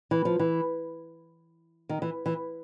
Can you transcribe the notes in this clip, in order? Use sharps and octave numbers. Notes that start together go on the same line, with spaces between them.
E3
F3
E3
D#3
E3
E3